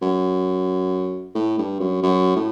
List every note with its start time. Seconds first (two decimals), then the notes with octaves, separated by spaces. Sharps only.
0.01 F#2
1.35 A2
1.58 G2
1.80 F#2
2.03 F#2
2.36 A2